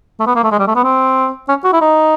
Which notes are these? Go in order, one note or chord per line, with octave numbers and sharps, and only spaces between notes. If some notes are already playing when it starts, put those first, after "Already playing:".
A3
B3
A#3
A3
G#3
G3
A3
B3
C4
C#4
F#4
E4
D#4